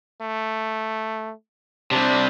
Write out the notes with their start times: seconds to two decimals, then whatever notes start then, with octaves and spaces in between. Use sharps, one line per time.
0.22 A3
1.91 C3 G3 D4